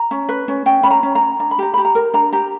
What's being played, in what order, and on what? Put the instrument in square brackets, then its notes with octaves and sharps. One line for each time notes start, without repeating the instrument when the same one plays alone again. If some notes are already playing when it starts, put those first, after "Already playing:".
Already playing: [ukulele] A#5
C#4
B4
C#4
C#4 G5
C#4 B5
A#5
C#4
A#5
C#4
D4 A#5
B5
G4 A#5
G4 B5
A#5
A#4
D4 A#5
G4 A#5